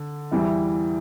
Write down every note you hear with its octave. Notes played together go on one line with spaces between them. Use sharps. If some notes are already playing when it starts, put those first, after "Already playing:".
Already playing: D3
E2 E3 G3 E4